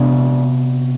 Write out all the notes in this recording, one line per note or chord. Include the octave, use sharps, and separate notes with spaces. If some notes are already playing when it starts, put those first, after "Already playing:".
Already playing: C3 B3 D4 D5